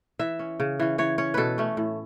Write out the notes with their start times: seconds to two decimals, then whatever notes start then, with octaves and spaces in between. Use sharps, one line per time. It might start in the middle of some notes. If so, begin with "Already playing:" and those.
0.19 E3 E5
0.39 C#4
0.60 C#3
0.80 E3 C#4
0.98 E3 C#5
1.18 C#4 C#5
1.34 B2 A4 B4
1.58 A3 C#4
1.77 A2